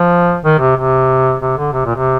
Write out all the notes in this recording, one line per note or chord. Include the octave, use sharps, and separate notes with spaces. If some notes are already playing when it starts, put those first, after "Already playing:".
Already playing: F3
D#3
C3
C3
C3
D3
C3
A#2
C3